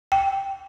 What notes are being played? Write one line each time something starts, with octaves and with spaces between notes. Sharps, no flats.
G5